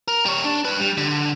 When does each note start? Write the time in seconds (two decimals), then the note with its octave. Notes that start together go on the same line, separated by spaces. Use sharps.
0.08 A#4
0.25 G3 C#5
0.44 D4
0.65 D4 B4
0.80 G3
0.97 D3